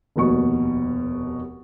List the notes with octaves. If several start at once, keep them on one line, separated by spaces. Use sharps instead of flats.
F1 D#2 B2 C#6